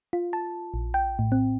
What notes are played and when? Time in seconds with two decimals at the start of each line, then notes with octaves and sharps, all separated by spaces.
0.13 F4
0.33 A5
0.74 A#1
0.94 G5
1.19 A2
1.32 C4